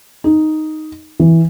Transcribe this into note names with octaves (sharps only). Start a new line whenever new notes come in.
D#4
E3